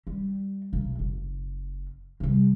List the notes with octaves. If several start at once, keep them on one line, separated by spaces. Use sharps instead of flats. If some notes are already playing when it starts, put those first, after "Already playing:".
G3
B1
F#1
C3 G3